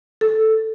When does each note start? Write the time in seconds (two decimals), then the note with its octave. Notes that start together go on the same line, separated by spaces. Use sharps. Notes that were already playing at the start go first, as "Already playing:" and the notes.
0.21 A4